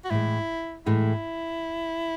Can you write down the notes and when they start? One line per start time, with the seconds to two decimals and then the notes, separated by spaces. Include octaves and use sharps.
0.05 F#4
0.11 A2 E3 G#3 E4
0.86 A2 E3 G#3 E4